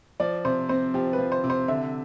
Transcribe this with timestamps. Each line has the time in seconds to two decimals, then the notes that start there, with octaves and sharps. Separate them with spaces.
0.20 F3 D5
0.45 C3 C5
0.69 C4 C5
0.94 F3 G4
1.13 B4
1.18 F3
1.32 C5
1.44 C3
1.50 C5
1.68 D3 E5